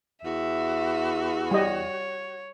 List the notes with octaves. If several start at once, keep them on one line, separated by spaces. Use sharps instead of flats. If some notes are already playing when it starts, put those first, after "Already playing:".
E2 F#4 E5
G3 C#5 D#5